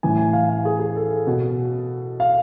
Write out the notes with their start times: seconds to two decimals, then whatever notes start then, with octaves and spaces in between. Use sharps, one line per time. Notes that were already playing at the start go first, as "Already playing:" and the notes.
0.03 A2 E3 G#5
0.18 G#5
0.33 F5
0.49 F5
0.65 G#4
0.80 G#4
0.96 A4
1.27 B2
2.20 F5